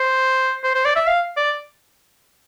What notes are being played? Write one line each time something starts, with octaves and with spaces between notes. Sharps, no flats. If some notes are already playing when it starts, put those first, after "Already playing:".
Already playing: C5
C5
C5
D5
E5
F5
D5